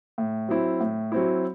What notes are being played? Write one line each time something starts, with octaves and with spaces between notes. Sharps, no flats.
A2
F#3 C4 E4
A2
F#3 C4 E4